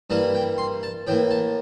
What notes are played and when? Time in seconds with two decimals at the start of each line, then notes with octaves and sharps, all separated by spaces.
0.10 G2 E3 G3 A#3 A5
0.35 G5
0.58 C6
0.83 A5
1.07 A2 E3 A#3 G5
1.31 A5